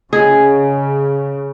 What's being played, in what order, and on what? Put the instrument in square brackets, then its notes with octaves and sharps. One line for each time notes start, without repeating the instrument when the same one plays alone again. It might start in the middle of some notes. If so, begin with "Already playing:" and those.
[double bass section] C#3 [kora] G#4 [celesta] D#5 G#5